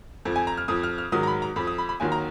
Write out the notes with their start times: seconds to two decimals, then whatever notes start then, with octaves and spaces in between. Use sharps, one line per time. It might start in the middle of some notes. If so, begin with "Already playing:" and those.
0.25 F2 F3
0.36 G#5
0.47 A#5
0.57 F6
0.68 F2 F3 D#6
0.83 F6
0.98 F6
1.12 G#2 D#3 F#3 D#6
1.23 A#5
1.27 B5
1.42 A#5
1.56 F2 F3 B5
1.67 D#6
1.78 B5
1.89 B5
2.00 D#2 D#3 F#3 G#5
2.12 A#5